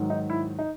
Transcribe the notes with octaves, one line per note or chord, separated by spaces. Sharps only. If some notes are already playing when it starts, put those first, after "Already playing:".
Already playing: G#2 D#3 F#3
D#4
E4
D#4